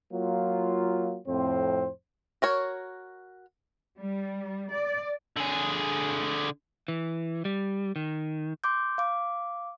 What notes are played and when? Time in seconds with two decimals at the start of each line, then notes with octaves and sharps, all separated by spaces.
0.13 F#3 A#3 F4
1.26 F2 A2 C4 C5
2.42 F#4 A#4 C#5
3.99 G3
4.72 D5
5.36 D3 G#4
6.88 E3
7.45 G3
7.96 D#3
8.64 C6 D6 G6
8.98 F5 D6